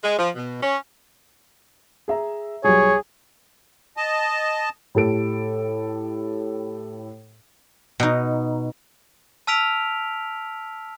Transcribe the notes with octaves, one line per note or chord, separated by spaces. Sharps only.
G#3
F3
B2
C#4
G#4 E5 A#5
B1 G3 G#4 C#5
D#5 A5
A2 G4 A4 D7
B2 D#4
A5 E6 F6 B6 D7 F7